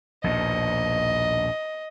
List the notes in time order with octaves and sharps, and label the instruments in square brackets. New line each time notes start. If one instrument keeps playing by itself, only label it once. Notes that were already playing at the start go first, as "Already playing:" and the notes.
[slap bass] A#1 D#2 B2 [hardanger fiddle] D#5